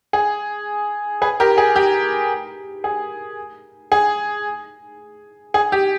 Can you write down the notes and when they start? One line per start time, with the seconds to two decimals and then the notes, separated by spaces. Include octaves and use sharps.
0.13 G#4
1.22 G#4 B4
1.40 G4 A#4
1.58 G#4
1.76 G4
2.84 G#4
3.92 G#4
5.54 G#4
5.72 G4